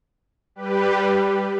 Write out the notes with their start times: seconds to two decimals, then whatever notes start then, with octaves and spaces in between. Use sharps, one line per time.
0.55 G3 G4 B4